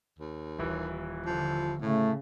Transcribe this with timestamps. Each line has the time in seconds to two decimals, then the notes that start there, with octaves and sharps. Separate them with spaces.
0.19 D#2
0.59 D#1 E3 E4
1.26 D3 F3
1.81 A2 C#3 A3